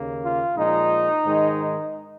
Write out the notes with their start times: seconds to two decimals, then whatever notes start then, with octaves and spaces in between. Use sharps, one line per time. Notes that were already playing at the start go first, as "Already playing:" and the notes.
Already playing: D#2 C#3 A#3
0.21 F4
0.56 A#2 F3 G#3 D#4
1.24 G#2 D#3 G#3